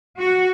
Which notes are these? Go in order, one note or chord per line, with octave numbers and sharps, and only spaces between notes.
F#4